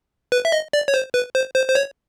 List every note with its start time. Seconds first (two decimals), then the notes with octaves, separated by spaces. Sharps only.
0.32 B4
0.45 E5
0.52 D#5
0.73 D5
0.88 C#5
0.94 C5
1.14 B4
1.35 C5
1.55 C5
1.68 C5
1.75 C#5